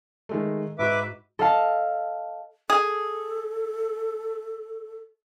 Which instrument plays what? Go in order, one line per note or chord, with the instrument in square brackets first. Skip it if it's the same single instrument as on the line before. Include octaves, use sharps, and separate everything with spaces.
[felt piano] D#3 G#3 A3
[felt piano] G#2 F#4 [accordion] B4 E5 D6
[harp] A4 D#5 F5 A5
[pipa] G#4 [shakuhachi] A4